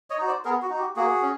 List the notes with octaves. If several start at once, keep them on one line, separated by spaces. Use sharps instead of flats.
C#5 D#5
D#4 F#4
C5 D5
B3 G#4 A#4
F#4
D#4
F#4 G4
A#3 F#4 G#4
C#4